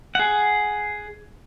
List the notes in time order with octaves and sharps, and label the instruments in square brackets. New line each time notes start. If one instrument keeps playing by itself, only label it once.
[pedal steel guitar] G#4 F#5